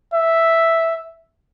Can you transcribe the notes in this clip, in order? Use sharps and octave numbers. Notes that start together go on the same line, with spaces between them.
E5